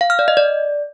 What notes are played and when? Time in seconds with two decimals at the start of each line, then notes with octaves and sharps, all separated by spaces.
0.01 F5
0.10 F6
0.19 D5
0.28 D#5
0.37 D5